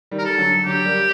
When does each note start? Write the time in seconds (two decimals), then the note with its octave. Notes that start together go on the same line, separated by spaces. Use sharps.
0.11 D#3 G3
0.18 A#4
0.25 A4
0.38 D3 F#3
0.64 D3 F#3 G4
0.85 G3 A#3